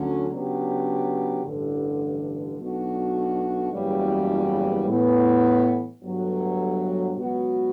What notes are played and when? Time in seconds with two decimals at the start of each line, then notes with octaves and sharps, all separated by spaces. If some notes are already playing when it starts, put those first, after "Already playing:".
Already playing: D2 D3 F#3 C#4
0.29 C#3 F#3 B3 D4 G4
1.43 A1 G2 D3
2.58 B1 B2 A3 D4 F#4
3.72 F#1 E2 C#3 G3
4.87 A2 E3 B3
6.01 G1 G2 F#3 A3
7.17 C#2 B2 F#3 B3 F#4